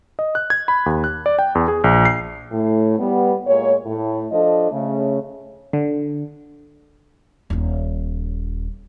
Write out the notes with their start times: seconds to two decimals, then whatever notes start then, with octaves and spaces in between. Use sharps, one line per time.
0.19 D#5
0.35 F#6
0.50 G#6
0.68 B5
0.86 D#2
1.04 F#6
1.26 D5
1.39 G5
1.55 E2
1.68 G#4
1.84 A#1
2.05 C7
2.52 A2
2.99 G3 B3
3.47 A#2 G#3 C#5
3.86 A2
4.32 F3 D4 A4 D#5
4.72 C#3 A3
5.73 D3
7.50 D#1 C#4